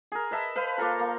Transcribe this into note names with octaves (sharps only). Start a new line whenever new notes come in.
G#4 A#4
B4 D#5 E5 A5
B4 C5 F5
A#3 F4 A4 A#4
A#3